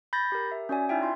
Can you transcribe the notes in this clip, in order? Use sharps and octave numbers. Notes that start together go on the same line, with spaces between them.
B5 G6 A6 A#6
G4 A#4
E5
C#4 F#4 D5 G#5
D#4 E4 E5 G5
F4 C6